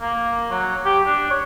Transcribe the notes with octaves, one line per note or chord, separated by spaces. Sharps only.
A#3
F#3
G4
D4
C#5